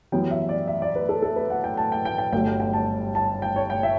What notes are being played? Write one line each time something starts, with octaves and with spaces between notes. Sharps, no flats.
F#2 E3 G3 B3 G5
E5
D5
E5
D5
B4
A4
A4
B4
F#5
G5
A5
G5
G5
G5
G1 G2 F#3 A3 G5
G5
G5
A5
A5
G5
C#5
G5
E5